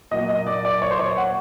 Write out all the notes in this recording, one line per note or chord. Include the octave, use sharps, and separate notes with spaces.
A#2 F#3 A#3 D#5 D#6
D#5 D#6
D5 D6
D5 D6
C#5 C#6
C5 C6
C#5 C#6
F#5